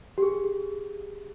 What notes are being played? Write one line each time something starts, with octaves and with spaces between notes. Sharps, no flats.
G4
G#4